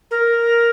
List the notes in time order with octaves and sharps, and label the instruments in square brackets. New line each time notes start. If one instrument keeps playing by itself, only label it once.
[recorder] A#4